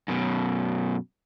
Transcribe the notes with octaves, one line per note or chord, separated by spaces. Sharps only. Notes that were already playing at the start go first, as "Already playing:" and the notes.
F#2 B2